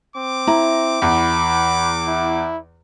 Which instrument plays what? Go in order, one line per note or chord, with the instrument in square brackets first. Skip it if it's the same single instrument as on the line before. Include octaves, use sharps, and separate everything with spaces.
[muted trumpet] C4 [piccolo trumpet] D6
[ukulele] E4 [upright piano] A#5
[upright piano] E2 [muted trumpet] B5
[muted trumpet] E4